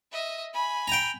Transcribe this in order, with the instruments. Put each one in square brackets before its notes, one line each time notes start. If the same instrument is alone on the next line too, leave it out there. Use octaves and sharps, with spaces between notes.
[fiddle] D#5 E5
G#5 B5
[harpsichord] G5 A#5